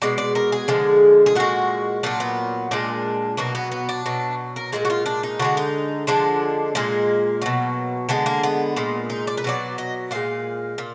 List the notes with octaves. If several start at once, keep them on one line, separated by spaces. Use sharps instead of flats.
B2 G#3 D5
D5
A#4
G#4
D3 F3 G#3
G#4
A#2 G#3 F#4
A#2 F#3 D4
B3
A#2 G#3 D4
B2 F#3 A#3
B3
B3
D4
B2 F#3
A#4
A#2 F3 G#3 G#4
F#4
F4
D4
D#4
D3 F3 G#3 F#4
D#4
D3 F3 G#3 D4
A#2 G#3 A#3
B2 F#3
D3 G#3 B3
A#3
B3
A#2 G#3
D#4
D5
B4
B2 F#3 D5
D#5
A#2 G#3 F5
A#2